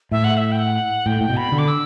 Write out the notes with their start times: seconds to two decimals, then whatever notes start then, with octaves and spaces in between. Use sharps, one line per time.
0.12 A2 E5
0.24 F#5
0.37 E5
0.52 G5
0.59 F#5
1.06 A2 G5
1.21 A2
1.30 B2
1.37 B5
1.52 D3
1.58 D6
1.68 E6